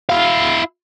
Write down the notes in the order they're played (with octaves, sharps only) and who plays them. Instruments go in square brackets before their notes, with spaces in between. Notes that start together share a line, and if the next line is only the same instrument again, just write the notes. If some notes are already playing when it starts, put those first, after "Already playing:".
[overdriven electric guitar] E4 F5